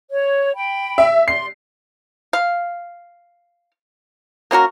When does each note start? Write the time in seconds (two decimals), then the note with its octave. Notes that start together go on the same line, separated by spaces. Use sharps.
0.09 C#5
0.55 G5 B5
0.98 E5
1.28 D5 C6 C7
2.33 F5
4.51 A#3 C#4 F#4 A#4